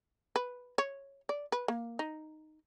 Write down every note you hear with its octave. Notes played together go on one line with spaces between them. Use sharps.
B4
C#5
D5
B4
A#3
D#4